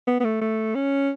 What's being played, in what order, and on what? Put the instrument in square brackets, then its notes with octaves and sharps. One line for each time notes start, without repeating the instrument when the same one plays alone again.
[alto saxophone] B3
B3
A3
A3
C#4